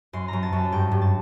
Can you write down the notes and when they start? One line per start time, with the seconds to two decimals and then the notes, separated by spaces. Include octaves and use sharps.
0.13 F#2 C6
0.28 F#2 A#5
0.43 A5
0.52 F#2
0.58 A5
0.72 G2 G5
0.91 G2
1.01 A5